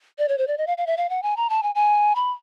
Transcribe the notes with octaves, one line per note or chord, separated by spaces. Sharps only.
D5
C#5
C5
D5
D#5
F5
F5
E5
F5
F#5
G#5
A#5
A5
G#5
G#5
B5